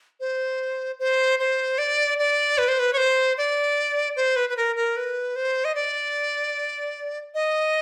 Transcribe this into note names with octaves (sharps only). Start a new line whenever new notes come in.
C5
C5
C5
D5
D5
B4
C5
B4
C#5
C5
D5
C5
B4
B4
A#4
A#4
B4
C5
D#5
D5
D#5